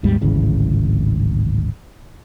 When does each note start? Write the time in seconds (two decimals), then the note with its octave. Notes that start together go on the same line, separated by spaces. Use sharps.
0.03 G#1 D#2 G#2 G3
0.21 D1 G#1 C#3 E3